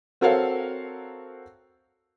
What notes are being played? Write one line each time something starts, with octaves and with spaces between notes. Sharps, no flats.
C4 F#4 A4 A#4 C#5 F5